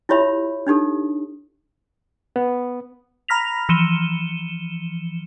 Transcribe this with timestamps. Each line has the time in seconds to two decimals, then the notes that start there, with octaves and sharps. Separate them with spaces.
0.09 E4 F4 G4 C#5 E5 B5
0.67 D4 D#4 G4 A4
2.36 B3
3.28 A#5 B5 F6 A#6 B6 F7
3.69 E3 F3 C#7 D#7 E7 G7